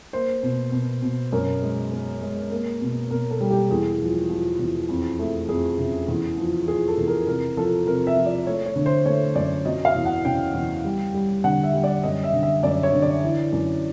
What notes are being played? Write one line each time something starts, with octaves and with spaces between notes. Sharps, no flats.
A#3 C5
B2
B2
B2
F#2 A#4
G#3
B3
G#3
A#3
B2
B2 A#4
A4
G3
G4
E2 G#4
F3
F3
E2
F2
A3
F2 G#4
C#3
E2
F3
F3 G#4
A4
E2
A#4
C3 A#4
F3 A4
C3 A#4
E5
F3
D5
A3 C#5
C#5
D3
C5
A3 C#5
F#2 D5
F#3 D#5
F5
E2
F#5
C#3 G5
E2
G3
G3
D3 F#5
E5
G3
D5
F#2 D#5
E5
D3
E5
F#2 D5
C#5
D3
D5
E3
F#2